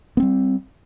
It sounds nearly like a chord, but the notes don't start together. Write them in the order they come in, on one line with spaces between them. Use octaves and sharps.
B3 C4 G3